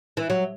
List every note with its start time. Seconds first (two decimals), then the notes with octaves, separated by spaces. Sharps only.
0.17 E3
0.30 F#3